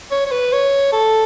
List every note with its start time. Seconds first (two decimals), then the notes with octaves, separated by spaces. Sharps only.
0.11 C#5
0.26 C#5
0.32 B4
0.53 C#5
0.93 A4